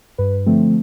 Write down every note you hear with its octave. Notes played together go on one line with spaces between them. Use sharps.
G2 B4
D3 F3 A3 C4